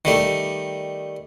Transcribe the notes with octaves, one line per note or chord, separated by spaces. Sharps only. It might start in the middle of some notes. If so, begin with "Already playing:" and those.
D#3 G3 A3